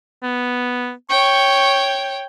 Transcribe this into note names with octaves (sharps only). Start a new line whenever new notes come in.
B3
C#5 G5 C#6